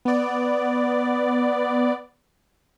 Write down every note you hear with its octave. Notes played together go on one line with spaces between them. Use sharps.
B3 D5